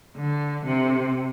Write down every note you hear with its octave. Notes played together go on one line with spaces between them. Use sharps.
D3
C3